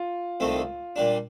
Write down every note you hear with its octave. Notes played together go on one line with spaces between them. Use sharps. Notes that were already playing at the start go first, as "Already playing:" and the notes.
Already playing: F4
C2 C3 D#3 A3 C4
A#2 G3 D4